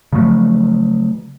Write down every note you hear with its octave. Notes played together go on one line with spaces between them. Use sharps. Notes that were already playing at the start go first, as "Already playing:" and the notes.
C#3 F3 F#3 A3